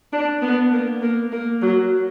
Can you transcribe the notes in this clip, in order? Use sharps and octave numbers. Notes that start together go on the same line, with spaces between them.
D4
B3
A#3
A#3
A#3
F#3